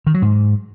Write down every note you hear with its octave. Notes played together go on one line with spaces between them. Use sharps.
D#3
F#3
G#2